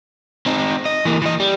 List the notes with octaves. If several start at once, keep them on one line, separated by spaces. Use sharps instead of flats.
C4 D#4
D#5
E3 A#3
E3 D#5
G3